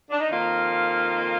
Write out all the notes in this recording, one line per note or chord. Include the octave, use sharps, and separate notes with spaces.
D4
D#4
F2 D#3 A#3 F4